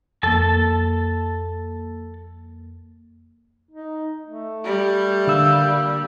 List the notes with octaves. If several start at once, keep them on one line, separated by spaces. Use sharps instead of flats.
F2 A#3 A4 A5
D#4
A3
G3
D3 A#3 E6